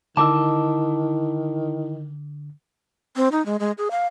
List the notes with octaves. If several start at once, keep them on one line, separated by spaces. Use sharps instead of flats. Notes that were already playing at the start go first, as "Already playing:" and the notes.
D3 D#3 E4 D#5 A5 D6 E6
C4
D#4
G#3
G#3
G#4
F5